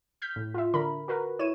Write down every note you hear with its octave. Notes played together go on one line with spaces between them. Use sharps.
F6 G6 B6
A2
F4 E5
D3 A#4 B5
F#4 A#4 B4
E4 C#5 D#7 E7